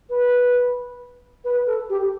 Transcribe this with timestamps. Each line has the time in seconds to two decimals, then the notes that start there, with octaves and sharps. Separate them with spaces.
0.10 B4
1.45 B4
1.67 A4
1.90 G4